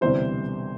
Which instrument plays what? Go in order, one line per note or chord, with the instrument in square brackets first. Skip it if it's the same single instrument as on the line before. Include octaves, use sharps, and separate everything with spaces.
[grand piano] E1 D2 C3 E3 G3 C5